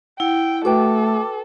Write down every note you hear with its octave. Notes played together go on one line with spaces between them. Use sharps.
E4 F#5 G5
A3 F#4 A4 B4 G5 D6